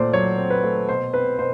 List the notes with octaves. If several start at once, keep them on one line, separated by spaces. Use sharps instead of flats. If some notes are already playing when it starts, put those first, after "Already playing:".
Already playing: A#2 A3 C4 C5 D5
F#3 C#5
C4
B4
A3
B2 C5
C4 B4
B2 C5